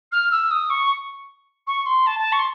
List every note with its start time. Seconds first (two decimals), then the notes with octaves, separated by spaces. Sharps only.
0.11 F6
0.31 E6
0.51 D#6
0.70 C#6
1.67 C#6
1.86 C6
2.06 A5
2.19 A5
2.32 C#6
2.39 C6